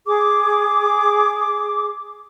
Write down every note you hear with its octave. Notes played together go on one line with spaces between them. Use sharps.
G#4 D6